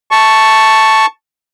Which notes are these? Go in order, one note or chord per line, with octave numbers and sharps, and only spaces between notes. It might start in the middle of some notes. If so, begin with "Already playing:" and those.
A5 C#6